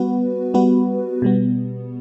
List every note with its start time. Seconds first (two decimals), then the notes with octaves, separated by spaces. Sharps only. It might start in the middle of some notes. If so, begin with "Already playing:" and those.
Already playing: G3 B3 F#4 B4
0.54 G3 B3 F#4 B4
1.22 B2 G3 B3